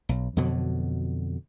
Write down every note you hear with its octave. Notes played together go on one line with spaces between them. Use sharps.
B1
F2 B2 D3 F#3